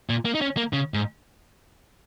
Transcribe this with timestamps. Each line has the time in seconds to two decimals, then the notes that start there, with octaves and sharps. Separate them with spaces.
0.09 A#2
0.25 A#3
0.35 D#4
0.41 C#4
0.57 A#3
0.73 C#3
0.94 G#2